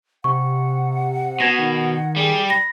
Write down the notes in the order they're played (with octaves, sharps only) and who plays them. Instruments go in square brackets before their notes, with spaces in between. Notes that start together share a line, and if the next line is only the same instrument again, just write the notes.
[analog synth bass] C3 [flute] F#5 [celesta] C#6
[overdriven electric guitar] B2 [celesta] G#6 A#6
[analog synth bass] D#3
[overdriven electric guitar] G3 [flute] G#4
[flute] B5 [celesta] A#6